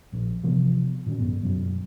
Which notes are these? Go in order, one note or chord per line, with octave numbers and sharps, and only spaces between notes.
D#1 A#1
C3 E3 F3 B3
A2 D#3 C#4
B1 G2 B3
F#1 B1 F#2